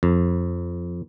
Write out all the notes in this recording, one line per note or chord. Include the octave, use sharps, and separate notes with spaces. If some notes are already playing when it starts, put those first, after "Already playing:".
F2